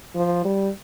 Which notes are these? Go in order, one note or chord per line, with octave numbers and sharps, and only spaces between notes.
F3
G3